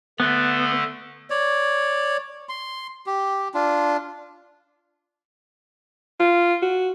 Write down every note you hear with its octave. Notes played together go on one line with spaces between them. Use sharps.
D3 A3 B3
C#5 D5
C6
G4
D4 F4
F4
F#4